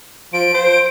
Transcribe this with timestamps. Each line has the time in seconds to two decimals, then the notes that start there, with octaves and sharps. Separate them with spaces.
0.33 F3 D7
0.54 C5